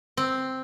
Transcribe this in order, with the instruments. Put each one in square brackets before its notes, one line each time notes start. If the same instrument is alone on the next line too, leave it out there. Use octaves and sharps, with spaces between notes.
[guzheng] C4